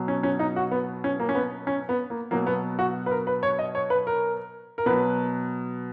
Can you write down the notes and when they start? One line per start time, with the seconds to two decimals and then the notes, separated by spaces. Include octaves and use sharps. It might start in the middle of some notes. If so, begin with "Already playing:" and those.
Already playing: B2 F#3
0.08 C#4
0.23 C#4
0.39 D#4
0.56 F#4
0.71 B3
1.04 C#4
1.20 A#3
1.29 C#4
1.35 B3
1.67 C#4
1.89 B3
2.10 A#3
2.31 B2 F#3 A#3
2.47 B3
2.79 F#4
3.06 B4
3.11 A#4
3.27 B4
3.43 C#5
3.59 D#5
3.75 C#5
3.90 B4
4.07 A#4
4.78 A#4
4.86 B2 F#3 B4